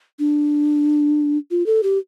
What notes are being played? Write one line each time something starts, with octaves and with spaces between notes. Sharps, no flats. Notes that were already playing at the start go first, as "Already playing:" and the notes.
D4
F4
A4
G4